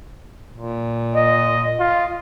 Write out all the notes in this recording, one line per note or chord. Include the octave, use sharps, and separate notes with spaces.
A#2
D#5
F4